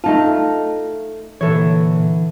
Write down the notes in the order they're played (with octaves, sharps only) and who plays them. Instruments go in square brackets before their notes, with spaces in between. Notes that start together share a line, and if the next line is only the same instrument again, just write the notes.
[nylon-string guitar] A3 A4 A5 [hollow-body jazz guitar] D#4 F4
[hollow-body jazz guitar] A#2 A4 C#5 [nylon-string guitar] D3 E3